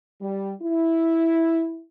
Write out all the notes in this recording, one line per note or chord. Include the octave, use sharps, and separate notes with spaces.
G3
E4